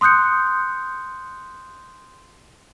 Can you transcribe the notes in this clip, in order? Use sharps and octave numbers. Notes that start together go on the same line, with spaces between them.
C6 D#6 F#6 G6 C#7